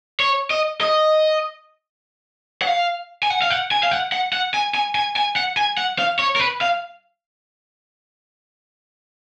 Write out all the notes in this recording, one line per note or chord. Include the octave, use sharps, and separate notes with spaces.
C#5
D#5
D#5
F#5
F5
G#5
F#5
F5
F#5
G#5
F5
F#5
F#5
F#5
G#5
G#5
G#5
G#5
F#5
G#5
F#5
F5
C#5
A#4
B4
F5